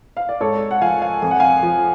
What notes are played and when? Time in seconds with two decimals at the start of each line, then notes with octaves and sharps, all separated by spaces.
0.17 F5
0.29 D5
0.40 G#2 A4 C#5
0.71 F#5
0.82 F3 F5 G#5
1.02 F5 G#5
1.22 F2 G#5
1.31 F#5
1.40 F5 G#5
1.63 F3